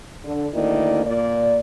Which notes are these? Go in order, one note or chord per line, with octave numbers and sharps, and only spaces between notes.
D3
D2 D#3 A#3 E4 D5
A#2 D5